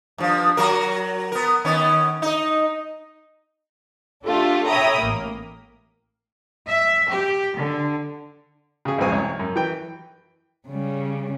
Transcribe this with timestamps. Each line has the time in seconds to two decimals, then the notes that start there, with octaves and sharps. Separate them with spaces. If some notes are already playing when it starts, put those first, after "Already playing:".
0.18 G2 F3
0.57 F#3 F#4 A#4
1.32 B3 A#4
1.65 D#3 B3 C#4
2.22 D#4 D#5
4.24 A3 D4 F4 G4 A4
4.69 C#5 E5 G5 A#5 B5 D#6
5.00 A1 A#3
6.68 E5
7.09 G4
7.56 D3
8.85 C#3 G#4
8.98 B1 F2 G#2 C4 G#5 C#6
9.12 C2 C#5
9.39 F#2
9.56 E3 B4 G5
10.68 C#3 G3